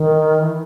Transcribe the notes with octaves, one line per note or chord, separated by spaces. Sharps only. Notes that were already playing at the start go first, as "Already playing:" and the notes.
Already playing: D#3
E3